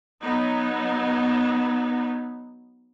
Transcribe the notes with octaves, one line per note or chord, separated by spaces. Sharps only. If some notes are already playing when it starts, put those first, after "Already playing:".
F#3 B3 D#4